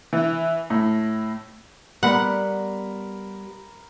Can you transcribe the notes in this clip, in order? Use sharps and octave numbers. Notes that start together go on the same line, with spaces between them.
E3
A2
G3 B3 A#4 F#5 B5 C6